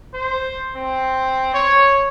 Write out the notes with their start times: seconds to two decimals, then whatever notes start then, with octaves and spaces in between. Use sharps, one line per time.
0.14 C5
0.75 C4
1.54 C#5